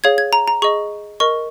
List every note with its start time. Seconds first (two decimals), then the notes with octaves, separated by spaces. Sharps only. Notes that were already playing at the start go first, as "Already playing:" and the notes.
0.04 G#4 C#5 F5 G#6
0.18 G#6
0.33 A#5
0.48 A#5
0.62 G#4 D#5 C#6
1.20 A#4 D#5 C#6